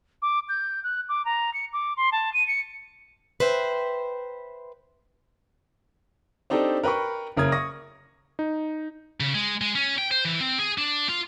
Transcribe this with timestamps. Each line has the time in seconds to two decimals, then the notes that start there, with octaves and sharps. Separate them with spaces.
0.22 D6
0.49 G6
0.84 F#6
1.09 D6
1.25 A#5
1.54 C#7
1.73 D6
1.97 C6
2.12 A5
2.33 D#7
2.48 C#7
3.40 B4 C5 E5 G5
6.50 C4 D4 D#4 G4 A4
6.84 A#4 B4 G5 B5 C#6
7.37 F#1 C#3 A#4 D#6 G#6
7.52 C#6 D#6 A#6
8.39 D#4
9.20 C#3
9.35 G#3
9.61 G#3
9.75 C#4
9.98 G5
10.11 C5
10.25 E3
10.41 C4
10.59 G#4
10.78 D4
11.09 F4